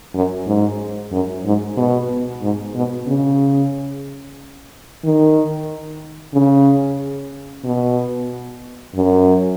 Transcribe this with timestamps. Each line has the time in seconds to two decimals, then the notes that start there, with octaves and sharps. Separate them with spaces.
0.14 F#2
0.47 G#2
1.12 F#2
1.45 G#2
1.77 B2
2.42 G#2
2.75 B2
3.07 C#3
5.04 D#3
6.34 C#3
7.65 B2
8.95 F#2